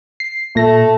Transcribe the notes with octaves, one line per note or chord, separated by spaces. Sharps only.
C7
A#2 A3 A#6